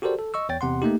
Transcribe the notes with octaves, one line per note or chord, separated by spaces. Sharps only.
F#4 G4 A4 A#4 C5 D5
A4
D#5 C#6 E6
E2 C#5 G5 A6
E2 C3 F#5 C6
A3 A#3 D#4 G4